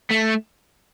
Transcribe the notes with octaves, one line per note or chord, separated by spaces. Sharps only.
A3